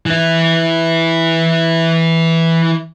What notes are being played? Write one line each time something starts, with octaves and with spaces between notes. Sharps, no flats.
E3 E4